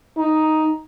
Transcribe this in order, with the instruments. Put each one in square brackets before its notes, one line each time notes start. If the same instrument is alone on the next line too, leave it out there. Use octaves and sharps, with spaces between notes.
[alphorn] D#4